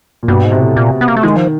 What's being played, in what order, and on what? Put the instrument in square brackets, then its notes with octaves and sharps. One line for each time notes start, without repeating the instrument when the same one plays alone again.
[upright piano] A#2
[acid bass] G2 [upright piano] B2
[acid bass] G#2
[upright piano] C3
[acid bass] A2
A#2
B3
A#3
A3
[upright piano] D#3 [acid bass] G#3
[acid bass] F3